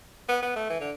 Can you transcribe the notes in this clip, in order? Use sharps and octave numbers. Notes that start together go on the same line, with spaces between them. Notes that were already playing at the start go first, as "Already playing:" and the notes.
B3
B3
A3
E3
D3